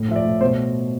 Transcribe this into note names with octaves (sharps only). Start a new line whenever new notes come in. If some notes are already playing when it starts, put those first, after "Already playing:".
Already playing: A2
F3 E5
D5
A2
B2 C5